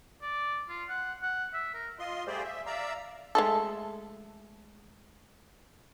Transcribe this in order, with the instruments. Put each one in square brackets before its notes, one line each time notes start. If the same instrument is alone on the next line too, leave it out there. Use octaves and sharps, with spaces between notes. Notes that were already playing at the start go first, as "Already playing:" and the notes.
[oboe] D5
F4
F#5
F#5
E5
A#4
[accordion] F4 D#5 C6
G3 A3 G4 G#4 C5 D5
E5
D5 E5 F5 A#5 E6
[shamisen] G#3 A3 A4